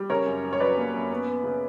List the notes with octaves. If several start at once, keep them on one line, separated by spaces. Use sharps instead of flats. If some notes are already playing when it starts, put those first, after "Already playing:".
Already playing: G3
C#3 A#4 C#5
F#2
F#2
C#5
F#3 B4 D5
A#3
F#2
B3
B3
C#3